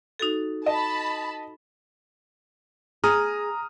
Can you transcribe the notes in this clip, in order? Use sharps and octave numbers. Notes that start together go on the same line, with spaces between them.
D#4 F#4 A4
D#5 A5 B5
G#4 A#5 D#6 F6